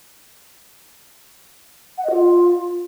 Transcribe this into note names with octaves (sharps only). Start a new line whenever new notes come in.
F#5
D#5
F4